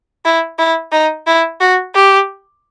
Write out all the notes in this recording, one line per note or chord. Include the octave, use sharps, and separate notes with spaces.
E4
E4
D#4
E4
F#4
G4